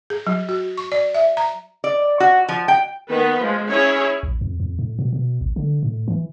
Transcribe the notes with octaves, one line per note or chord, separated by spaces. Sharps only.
G#4
F#3
F#4
C#6
D5
E5
A#5
D5
F#4
F3
G5
D#3 B3 B4
F3 G#3
C#4 E4 G#4 C#5
A#1
F2
F2
A2
B2
B2
A1
D3
A2
E3